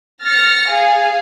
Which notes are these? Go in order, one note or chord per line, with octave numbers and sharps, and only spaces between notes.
F6 A6 A#6 C#7
G#4 F5